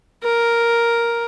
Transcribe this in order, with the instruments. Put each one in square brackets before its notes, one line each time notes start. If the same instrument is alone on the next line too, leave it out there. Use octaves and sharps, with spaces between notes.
[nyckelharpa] A#4